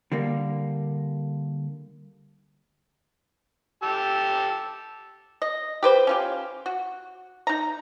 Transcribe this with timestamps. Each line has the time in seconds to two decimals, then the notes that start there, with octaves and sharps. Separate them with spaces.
0.12 D3 G3 A#3
3.83 G4 A5 E6
5.42 D#5
5.83 G4 B4 C5
6.07 C#4 F4 G4
6.66 F#4
7.47 D#4 A#5